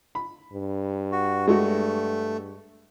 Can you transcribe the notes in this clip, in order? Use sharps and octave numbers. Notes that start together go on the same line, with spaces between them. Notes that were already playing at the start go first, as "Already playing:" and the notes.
B5
G2
F#4
G#3 A3 F#4